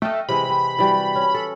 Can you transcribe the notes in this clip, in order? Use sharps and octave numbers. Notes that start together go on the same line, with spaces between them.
A3 D#5 F5 G5
C3 E3 G#3 B5
G#3 C4
E3 G3 F#4
C#4
A4